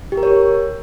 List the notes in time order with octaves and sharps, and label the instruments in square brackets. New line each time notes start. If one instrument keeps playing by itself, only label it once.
[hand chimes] G4
A#4
C#5